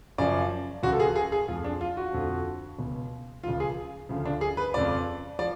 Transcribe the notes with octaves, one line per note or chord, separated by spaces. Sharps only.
F#2 C#3 F3 D5
C#2 C#3 F3 F#4
A4
G#4
G#4
G#4
F2 F3 F4
D4
F4
F#4
F2 D3 F3
C#2 B2
C#2 C#3 F3 F4
G#4
D2 C#3 F3
D4
G#4
B4
F2 C#3 F3 D5
F3 D5